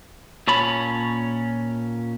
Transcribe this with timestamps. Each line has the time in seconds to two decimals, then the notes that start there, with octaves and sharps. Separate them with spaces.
0.47 A#2 C#4 C#5 A5 B5